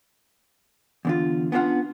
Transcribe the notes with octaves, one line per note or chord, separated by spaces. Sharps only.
E2 D3 F4
B3 C#4 D4 F4 F#5